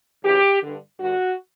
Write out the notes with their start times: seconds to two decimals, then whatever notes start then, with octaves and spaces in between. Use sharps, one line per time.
0.24 D2 C#3 E3 G4
0.61 G2 D3
0.99 G2 D3 F#4